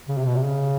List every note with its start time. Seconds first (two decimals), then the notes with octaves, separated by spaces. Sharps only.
0.08 C#3
0.18 C3
0.27 B2
0.36 C3
0.45 C#3